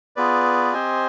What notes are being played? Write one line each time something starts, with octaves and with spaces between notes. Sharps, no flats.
B3 F4 G#4 B4 D5
C4 G4 C5 D#5 G#5